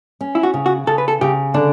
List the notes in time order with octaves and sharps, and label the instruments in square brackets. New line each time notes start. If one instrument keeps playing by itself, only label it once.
[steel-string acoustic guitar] C#4
[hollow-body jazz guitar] E4
F#4
[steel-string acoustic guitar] C#3
[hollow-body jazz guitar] F#4
[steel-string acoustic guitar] C#3 [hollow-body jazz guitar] A4
[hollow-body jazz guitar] B4
A4
[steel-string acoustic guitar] C#3 [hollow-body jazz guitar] G4
[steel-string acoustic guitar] D3 [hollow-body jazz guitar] D4